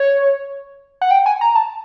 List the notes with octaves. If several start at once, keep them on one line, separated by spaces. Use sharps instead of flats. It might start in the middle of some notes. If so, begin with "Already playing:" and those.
Already playing: C#5
F#5
G5
G#5
A#5
A5